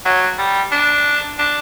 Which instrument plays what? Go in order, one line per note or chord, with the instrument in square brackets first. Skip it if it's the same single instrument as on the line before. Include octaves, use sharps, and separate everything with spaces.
[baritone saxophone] F#3
G3
D4
D4